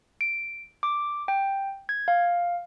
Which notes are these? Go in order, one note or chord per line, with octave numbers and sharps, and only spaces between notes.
D7
D6
G5
G#6
F5